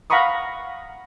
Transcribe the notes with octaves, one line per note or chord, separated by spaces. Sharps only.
F5 F#5 A#5 B5 C#6 D#6